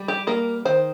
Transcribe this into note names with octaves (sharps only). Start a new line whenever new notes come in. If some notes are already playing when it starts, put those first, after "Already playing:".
Already playing: G3
G4
A#3 A#4
D#3 C5